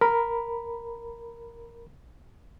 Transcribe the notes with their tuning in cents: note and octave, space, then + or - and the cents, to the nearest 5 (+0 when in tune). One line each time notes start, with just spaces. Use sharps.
A#4 +0 B5 +0